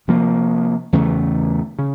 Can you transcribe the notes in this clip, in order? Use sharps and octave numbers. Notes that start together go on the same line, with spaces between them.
C3 F3 A#3
E2 C#3 E3 A3
C#3